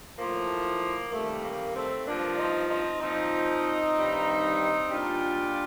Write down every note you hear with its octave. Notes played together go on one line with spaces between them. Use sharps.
A2 F3 A#3
C3 D#3 G3 A3
A#3
A3 C4
G2 F3 A#3 D4
C4 D#4
C4 D#4
A#2 F3 C4 D#4
G2 D#3 G3
A#2 G3 D4 F4